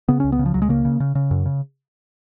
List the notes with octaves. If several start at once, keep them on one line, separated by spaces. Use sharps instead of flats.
C#3 B3
C#2 C#4
B3
C#3
F3
C#2 F#3
G#3
C#3 A#3
C#3
C#3
C#3
F#2
C#3